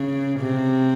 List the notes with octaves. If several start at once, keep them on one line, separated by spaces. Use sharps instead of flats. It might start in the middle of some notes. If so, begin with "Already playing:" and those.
Already playing: C#3
C3